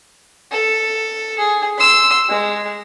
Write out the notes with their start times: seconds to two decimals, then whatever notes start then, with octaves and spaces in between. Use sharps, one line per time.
0.52 A4
1.39 G#4
1.78 C6 E6
2.30 G#3